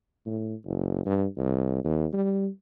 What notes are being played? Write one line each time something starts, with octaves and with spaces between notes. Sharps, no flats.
A2
F#1
G2
C2
D#2
G3